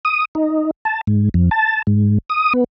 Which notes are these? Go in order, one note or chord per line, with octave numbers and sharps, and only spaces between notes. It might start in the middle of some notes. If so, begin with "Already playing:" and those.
D#6
D#4
A5
G#2
F2
A5
G#2
D#6
B3